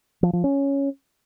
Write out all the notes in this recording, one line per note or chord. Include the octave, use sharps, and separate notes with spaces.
F3
F3
C#4